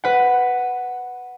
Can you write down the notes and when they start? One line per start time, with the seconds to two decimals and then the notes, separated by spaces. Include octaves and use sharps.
0.04 B4 F#5